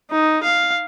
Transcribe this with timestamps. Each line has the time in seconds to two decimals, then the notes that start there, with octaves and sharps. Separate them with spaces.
0.11 D#4
0.44 F5